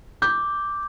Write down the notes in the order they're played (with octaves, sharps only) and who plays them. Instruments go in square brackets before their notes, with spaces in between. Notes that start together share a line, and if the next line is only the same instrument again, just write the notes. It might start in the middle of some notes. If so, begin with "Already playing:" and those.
[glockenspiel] D6 [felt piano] G6